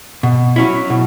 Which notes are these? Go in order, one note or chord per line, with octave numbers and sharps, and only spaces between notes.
B2
F#3 C#4 E4
B2